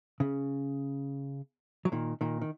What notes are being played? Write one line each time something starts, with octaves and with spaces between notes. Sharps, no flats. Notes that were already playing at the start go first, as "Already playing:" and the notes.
C#3
F#3
A#2 D#3
A#2 D#3
D#3